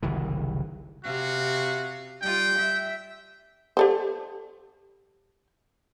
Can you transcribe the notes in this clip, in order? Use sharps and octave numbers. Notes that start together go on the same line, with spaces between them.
F#1 C2 D#3 E3
C3 F#4 F5
G3 F4 G5
E5
G4 A4 C5